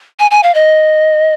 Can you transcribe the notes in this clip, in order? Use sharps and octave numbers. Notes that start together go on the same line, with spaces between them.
G#5
G#5
F5
D#5